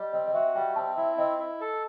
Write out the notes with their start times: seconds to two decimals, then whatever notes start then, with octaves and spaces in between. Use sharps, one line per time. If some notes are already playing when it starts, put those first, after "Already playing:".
Already playing: G3 D#5
0.13 C4 D#5
0.27 D#5
0.34 F#4 E5
0.55 G3 G5
0.76 C4 A5
0.97 E4 E5
1.18 C4 D#5
1.39 E4
1.61 A4